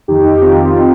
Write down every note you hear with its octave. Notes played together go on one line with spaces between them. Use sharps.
F2 D#3 D#4 G4
C4 F4
D#4